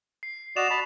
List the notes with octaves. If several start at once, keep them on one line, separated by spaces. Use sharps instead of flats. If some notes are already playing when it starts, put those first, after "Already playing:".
C7
F#4 D5 D#5 E7 F7
A5 B5